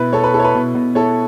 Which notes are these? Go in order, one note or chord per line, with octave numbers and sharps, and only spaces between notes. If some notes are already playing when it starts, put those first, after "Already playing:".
Already playing: B2 E4 B4
B2 A4 C#5
B4
E4 A4
C#5
B4
B2
B2
E4 A4 C#5